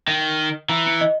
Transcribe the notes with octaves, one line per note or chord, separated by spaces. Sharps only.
D#3
E3 A#5
A#5 C#7 D7
D#5